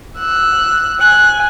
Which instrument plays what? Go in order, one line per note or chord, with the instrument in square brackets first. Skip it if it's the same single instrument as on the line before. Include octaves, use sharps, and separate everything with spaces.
[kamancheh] E6 F#6
[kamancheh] G#5 [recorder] F#6